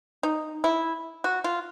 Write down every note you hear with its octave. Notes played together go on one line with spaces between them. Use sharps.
D#4
E4
F#4
F4